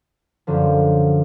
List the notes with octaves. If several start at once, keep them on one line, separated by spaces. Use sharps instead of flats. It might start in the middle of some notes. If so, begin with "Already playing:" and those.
F#2 D3 F3